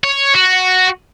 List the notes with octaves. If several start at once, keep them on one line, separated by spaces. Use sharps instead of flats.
C#5
F#4